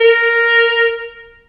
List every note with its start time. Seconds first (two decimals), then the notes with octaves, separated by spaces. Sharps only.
0.01 A#4